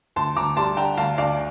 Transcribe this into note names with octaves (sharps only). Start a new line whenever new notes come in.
D2 A5 C6
D2 A#5 D6
G3 A5 C6
D3 G5 A#5
D2 F5 A5
D2 D5 F5